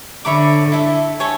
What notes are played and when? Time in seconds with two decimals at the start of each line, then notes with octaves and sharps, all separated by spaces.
0.25 D3 C#5 E5 B5 D6
0.72 E4 A4 E5
1.20 A4 C#5 G#5